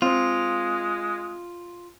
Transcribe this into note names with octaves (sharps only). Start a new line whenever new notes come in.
G#3 C4 F4